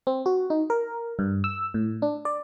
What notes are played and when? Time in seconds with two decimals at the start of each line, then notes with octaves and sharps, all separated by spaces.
0.07 C4
0.26 F#4
0.50 D#4
0.70 A#4
1.19 G2
1.44 E6
1.74 A2
2.02 D4
2.25 D5